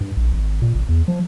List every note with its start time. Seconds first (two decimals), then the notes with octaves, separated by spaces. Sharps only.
0.01 G2
0.17 A#1
0.33 G#1
0.62 A#2
0.75 G#1
0.89 E2
1.08 F3